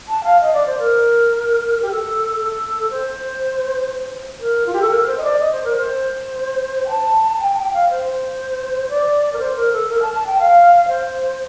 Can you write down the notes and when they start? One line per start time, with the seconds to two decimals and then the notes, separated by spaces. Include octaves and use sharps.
0.08 A5
0.24 F5
0.40 D#5
0.53 D5
0.66 C5
0.79 A#4
1.82 G4
1.91 A4
2.41 A4
2.90 C5
4.40 A#4
4.66 F4
4.73 G4
4.81 A4
4.91 A#4
5.02 A#4
5.07 C5
5.18 D#5
5.24 D5
5.39 D#5
5.52 C5
5.64 A#4
5.77 C5
6.86 G5
6.89 A5
7.40 G5
7.56 G5
7.73 F5
7.89 C5
8.89 D5
9.33 A#4
9.39 C5
9.56 A#4
9.73 A4
9.89 A#4
10.02 A5
10.13 A5
10.26 G5
10.39 F5
10.88 C5